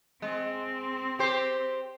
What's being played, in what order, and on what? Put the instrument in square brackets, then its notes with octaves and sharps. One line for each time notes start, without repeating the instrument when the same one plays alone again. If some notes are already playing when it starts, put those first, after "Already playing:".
[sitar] G#3 [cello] C4
[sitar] G4 C5